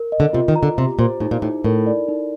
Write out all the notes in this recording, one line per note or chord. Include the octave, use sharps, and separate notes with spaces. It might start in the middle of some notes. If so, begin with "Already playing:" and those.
Already playing: A#4
D#5
D3
C3 F4
D#3
A#5
D3
C3 G4
A#2 C5
A2 D#4
A#2
A2 D#4
A2 A#4
D5
D#4